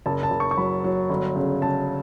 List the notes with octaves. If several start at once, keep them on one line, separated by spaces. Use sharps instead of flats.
F#1 A5
A5
F#1
C#6
C#6
F#3 B5
F#3
G1
C#3
C#3 A5